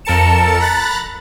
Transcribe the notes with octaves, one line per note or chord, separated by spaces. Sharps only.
F2 A4 A#4 A5 C#7 E7
A#5 B5 F#6 A6